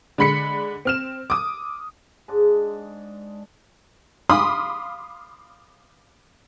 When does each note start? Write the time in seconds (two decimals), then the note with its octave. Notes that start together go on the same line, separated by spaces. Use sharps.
0.18 D3 G#3 B5 B6 C#7
0.85 C4 F6 E7
1.30 D6 D#6
2.28 G#2 G#3 D4
4.30 F5 B5 C6 D6 D#6